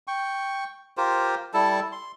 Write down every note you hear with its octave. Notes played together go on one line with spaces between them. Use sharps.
G5 C#6
F4 G4 A#4 C5
G3 E4 A4 A5
C6